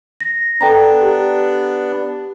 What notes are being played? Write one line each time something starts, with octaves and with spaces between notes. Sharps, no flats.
A#6
B3 D4 A4 G5 A#5
G4